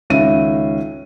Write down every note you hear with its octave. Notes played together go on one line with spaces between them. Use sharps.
C#2 D#3 C#4 E5 D#7